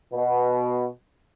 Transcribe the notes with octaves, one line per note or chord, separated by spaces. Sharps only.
B2